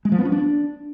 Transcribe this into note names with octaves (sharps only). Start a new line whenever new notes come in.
G#3
F3
B3
C#4
D4